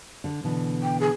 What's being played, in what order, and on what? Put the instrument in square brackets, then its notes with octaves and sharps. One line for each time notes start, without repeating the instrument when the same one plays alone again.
[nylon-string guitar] D3
B2 D3 E3
[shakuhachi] G5
G#4